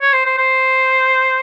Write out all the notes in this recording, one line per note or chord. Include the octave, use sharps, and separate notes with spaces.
C#5
C5
C5
C5